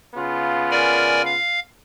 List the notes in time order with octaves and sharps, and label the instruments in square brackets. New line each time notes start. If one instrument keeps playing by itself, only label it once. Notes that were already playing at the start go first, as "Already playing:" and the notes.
[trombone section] C#3 B3 F4
[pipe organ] A#4 D5 G#5
F5